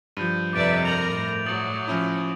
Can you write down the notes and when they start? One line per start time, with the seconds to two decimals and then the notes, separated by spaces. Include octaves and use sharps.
0.17 G2 F3 G6 D#7
0.53 F2 C3 B4 D5 E5 D6 A6 D7
0.83 A#4 A#5 G6 F7 F#7
1.13 A2
1.46 F#3 D#6 A6 F#7
1.88 F3 C#4 E4